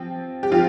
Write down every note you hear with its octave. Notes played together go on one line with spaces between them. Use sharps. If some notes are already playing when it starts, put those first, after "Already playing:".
Already playing: F3 C4
G4
F3 C4 F4